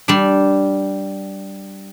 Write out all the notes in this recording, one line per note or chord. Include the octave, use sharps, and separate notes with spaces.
G3 D4